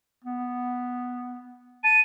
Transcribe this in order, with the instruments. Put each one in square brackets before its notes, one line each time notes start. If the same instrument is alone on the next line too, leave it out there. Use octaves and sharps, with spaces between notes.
[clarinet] B3
[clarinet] A5 [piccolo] D#7